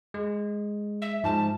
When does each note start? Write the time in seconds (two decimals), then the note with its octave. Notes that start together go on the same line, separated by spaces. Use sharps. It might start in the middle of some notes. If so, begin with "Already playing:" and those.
0.14 G#3
1.02 E5
1.24 G#2 F3 A5